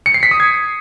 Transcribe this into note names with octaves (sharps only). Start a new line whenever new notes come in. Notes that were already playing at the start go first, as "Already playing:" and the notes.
C#7
C7
B6
D#6
G#6